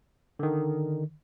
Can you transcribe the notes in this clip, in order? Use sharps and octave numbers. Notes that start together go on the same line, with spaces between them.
D3 D#3